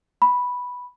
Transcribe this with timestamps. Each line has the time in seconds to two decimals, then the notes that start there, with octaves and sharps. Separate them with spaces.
0.22 B5